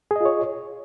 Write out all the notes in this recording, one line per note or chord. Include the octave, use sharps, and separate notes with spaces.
F4 G#4 C#5 D#5